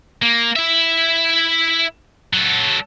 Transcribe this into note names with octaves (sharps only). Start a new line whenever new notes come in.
A#3
E4 E5
F#3 A4